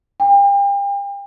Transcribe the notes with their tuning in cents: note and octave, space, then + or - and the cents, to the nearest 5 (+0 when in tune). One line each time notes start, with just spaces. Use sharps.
G5 +35